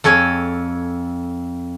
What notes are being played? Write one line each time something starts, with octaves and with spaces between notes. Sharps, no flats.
F2 A4 C#5 G#5